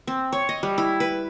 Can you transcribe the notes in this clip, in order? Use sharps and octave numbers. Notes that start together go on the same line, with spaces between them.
C4
C#5
D#5
G3
E4
B4